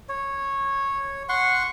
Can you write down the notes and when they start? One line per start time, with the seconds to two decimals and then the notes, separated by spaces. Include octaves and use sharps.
0.09 C#5
1.29 F#5 C6 C#6